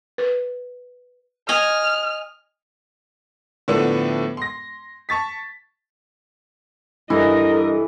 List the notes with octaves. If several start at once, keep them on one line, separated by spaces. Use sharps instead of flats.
B4
D#5 G#5 F6
A2 D3 F3 B3 D4 A4
C6 A#6
A5 C#6 A6 B6
G2 E3 A4 A#4 D#5